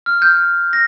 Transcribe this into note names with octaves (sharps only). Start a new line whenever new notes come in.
F6
G6
A#6